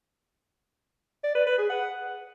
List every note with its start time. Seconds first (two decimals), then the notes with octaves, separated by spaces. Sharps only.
1.24 D5
1.35 B4
1.47 B4
1.58 G#4
1.69 F#5